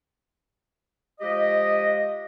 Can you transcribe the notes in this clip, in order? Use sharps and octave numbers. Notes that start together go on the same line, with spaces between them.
F3 G#3 G4 D#5